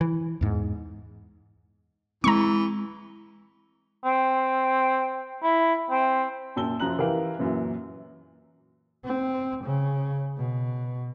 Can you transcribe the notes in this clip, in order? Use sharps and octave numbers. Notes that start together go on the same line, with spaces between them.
E3
E2 G#2
E3 G#3 C4 A#5 C#6
C4
E4
C4
F#2 A#2 A5 E6 G7
F#2 F3 A#5 F#6 F#7
E3 G4 A#4 F5 A#5
F#2 A#2 E3 F#3
C4
C#3
B2